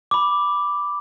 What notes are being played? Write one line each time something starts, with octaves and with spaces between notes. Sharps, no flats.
B5 D6